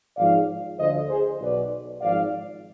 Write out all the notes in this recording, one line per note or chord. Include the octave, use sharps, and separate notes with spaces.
G#1 G#2 F3 D5 F5
D2 D3 F3 C5 D#5
G#4 C5
B1 B2 B4 D5
G#1 G#2 F3 D5 F5